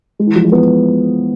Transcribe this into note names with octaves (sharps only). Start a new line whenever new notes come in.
G#3
E3
F3
G#3
B3